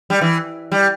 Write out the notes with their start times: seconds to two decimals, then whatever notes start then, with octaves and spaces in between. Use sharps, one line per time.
0.10 G3
0.21 E3
0.72 G3